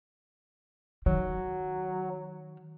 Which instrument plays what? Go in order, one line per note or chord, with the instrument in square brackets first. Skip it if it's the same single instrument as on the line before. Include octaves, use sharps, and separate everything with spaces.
[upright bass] D#3 [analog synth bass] F#3